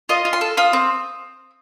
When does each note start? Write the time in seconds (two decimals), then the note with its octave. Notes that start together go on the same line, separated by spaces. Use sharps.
0.09 F4 D#5
0.25 F4
0.33 C6
0.41 A4
0.57 F4 D#6
0.73 C4